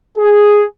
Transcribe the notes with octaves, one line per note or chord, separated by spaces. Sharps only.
G#4